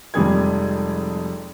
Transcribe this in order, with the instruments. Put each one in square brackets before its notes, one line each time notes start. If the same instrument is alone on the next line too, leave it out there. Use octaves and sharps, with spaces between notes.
[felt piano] F1 F2 G3 G#3 G#4 G#6